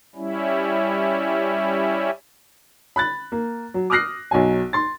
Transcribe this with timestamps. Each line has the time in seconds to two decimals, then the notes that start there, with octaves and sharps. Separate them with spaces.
0.16 G3 C#4 E4
2.96 B5 F#6 A6
3.32 A#3
3.74 F#3
3.90 D6 D#6 F6 F#6 A#6 C7
4.31 B1 F#3 G#5
4.73 C6 A6